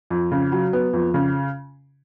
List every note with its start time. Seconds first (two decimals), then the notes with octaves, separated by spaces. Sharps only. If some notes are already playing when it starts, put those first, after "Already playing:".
0.10 F2
0.31 C#3
0.52 F#3
0.73 B3
0.93 F2
1.14 C#3